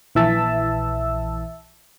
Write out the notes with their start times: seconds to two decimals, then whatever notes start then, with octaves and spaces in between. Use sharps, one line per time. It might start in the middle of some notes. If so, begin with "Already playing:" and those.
0.15 A#1 E3 E5 A5 E6